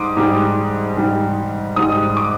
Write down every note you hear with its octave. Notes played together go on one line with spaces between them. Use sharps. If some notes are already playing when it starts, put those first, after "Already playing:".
Already playing: G#2 G3 C6 D6 D#6
G#2 G3
G#2 G3
G#2 G3 D#6
D6